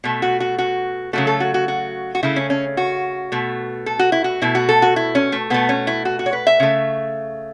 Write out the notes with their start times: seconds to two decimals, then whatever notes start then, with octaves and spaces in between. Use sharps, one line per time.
0.04 B2 A3
0.22 F#4
0.40 F#4
0.59 F#4
1.13 C#3 F#3 A3 F#4
1.27 A4
1.40 F#4
1.54 F#4
1.68 F#4
2.15 F#4
2.23 C#3 A3 E4
2.36 C#4
2.50 C#4
2.77 F#4
3.32 B2 A3
3.86 A4
3.99 F#4
4.12 E4
4.24 F#4
4.42 B2 A3 E4
4.55 F#4
4.69 A4
4.82 F#4
4.96 E4
5.15 C#4
5.32 A3
5.50 B2 A3 B3
5.69 C#4
5.87 E4
6.05 F#4
6.19 F#4
6.26 C#5
6.33 B4
6.47 E5
6.60 C#3 A3